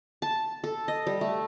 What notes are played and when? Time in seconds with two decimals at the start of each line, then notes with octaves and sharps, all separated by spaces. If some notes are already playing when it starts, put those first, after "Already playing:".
0.22 A5
0.64 A4
0.88 D#5
1.07 G3
1.21 A3